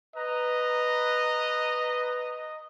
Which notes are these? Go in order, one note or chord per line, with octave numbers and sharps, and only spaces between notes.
B4 D#5 A#5